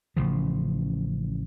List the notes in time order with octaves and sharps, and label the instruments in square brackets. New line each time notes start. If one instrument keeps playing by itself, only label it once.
[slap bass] A1 C#3 F3